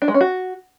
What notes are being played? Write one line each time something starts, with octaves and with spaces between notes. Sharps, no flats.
D4
G#3
C#4
F#4